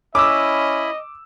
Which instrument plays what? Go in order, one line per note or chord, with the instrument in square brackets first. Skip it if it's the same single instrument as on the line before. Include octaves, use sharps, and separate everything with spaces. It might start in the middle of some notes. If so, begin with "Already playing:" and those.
[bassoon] C#4 [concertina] E4 B5 [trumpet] D#5 [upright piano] D6 E6